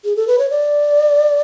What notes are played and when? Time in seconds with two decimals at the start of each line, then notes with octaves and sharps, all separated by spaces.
0.05 G#4
0.16 A4
0.28 B4
0.39 C#5
0.50 D5